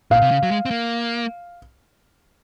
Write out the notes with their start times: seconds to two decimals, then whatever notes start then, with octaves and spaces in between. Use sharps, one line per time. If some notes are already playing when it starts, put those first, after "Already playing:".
0.11 A#2 F5
0.22 C3
0.31 C#3
0.43 F#3
0.51 G#3
0.65 C4
0.71 A#3